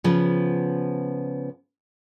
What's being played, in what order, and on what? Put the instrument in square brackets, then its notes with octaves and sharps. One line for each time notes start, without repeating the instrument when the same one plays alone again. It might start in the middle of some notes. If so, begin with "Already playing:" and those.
[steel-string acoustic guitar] C#3 F3 B3